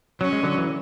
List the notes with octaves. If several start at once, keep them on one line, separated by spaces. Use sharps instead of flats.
F#3 C#4
G#3
D3 F#3
E3